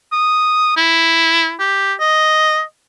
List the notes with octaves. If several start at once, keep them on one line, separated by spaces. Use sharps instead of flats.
D#6
E4
G4
D#5